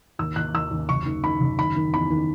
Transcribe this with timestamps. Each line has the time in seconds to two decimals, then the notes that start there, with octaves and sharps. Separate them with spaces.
0.19 D#2 E6
0.36 D#2 F#6
0.54 D#2 E6
0.71 D#2
0.89 F#1 C#6
1.06 D#3
1.24 D#3 B5
1.40 F#1
1.59 D#3 B5
1.76 D#3
1.93 E2 B5
2.10 D#3